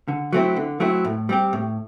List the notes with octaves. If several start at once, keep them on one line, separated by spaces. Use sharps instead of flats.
D3
F#3 A3 C4 E4
D3
F#3 A3 C4 E4
A2
G3 C4 G4
A2